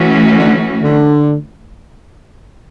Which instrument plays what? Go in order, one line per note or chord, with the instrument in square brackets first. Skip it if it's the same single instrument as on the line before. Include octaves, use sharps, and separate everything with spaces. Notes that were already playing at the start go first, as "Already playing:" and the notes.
Already playing: [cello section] E3 A3 C#4 F#4
[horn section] D3
D3